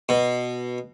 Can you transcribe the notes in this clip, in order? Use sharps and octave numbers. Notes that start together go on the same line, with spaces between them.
B2